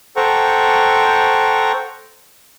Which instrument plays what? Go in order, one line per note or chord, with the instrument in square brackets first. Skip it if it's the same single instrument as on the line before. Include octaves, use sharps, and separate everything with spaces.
[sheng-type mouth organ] A4 C5 F#5 G5 A#5 C#6